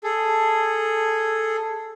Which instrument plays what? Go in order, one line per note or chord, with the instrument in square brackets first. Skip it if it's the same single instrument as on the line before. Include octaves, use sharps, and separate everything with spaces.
[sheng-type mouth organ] G#4 A4